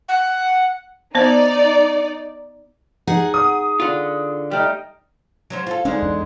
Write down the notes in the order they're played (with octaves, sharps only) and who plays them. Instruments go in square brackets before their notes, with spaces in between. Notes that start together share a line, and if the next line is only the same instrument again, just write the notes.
[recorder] F#5
[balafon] B3 C5 [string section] D#4 D5
[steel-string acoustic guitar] D#4 G#4 F#5
[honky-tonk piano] D#6
[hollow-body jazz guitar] D3 F4
[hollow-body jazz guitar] G3 A3 [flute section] D#4 G5 F6
[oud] F#3 C#4 C5
F4 A4
[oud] D3 G#3 D#4 [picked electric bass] C#4
[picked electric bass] E2